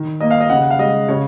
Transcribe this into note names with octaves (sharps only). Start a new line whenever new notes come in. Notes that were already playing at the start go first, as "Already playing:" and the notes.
Already playing: D#3
A#3 D#5
F5
D#5
C#3 F#5
F#5
F5
G#3 D#5
C#3 C#5